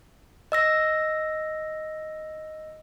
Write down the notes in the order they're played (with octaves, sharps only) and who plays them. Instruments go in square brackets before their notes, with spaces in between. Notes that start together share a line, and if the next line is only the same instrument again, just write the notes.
[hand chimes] D#5 E6 A#6